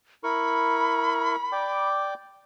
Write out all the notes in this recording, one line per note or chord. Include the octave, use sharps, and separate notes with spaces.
E4 A#4 B5 C#6
D5 G5 D6